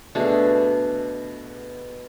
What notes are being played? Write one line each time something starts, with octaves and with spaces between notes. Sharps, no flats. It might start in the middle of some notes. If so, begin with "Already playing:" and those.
B2 A3 D4 G#4